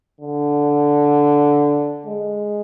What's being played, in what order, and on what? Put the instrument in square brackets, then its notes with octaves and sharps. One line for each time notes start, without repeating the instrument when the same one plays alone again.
[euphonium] D3
G#3